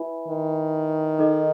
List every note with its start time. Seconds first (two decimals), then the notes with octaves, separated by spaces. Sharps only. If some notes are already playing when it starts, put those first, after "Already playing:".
Already playing: E4 B4 E5 G#5 B5
0.28 D#3
1.19 D#4 A4 D#5